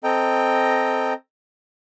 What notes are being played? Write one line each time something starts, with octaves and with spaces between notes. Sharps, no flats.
C4 A4 D#5 G5 A#5